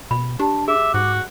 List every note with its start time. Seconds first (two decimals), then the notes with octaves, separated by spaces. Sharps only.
0.11 B2 B5
0.39 D4 G4 A5
0.68 G#4 E5 D6
0.94 G#2 F#4